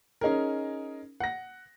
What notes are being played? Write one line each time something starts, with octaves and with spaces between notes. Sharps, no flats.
C#4 D#4 G#4 A#4
F#5 A#6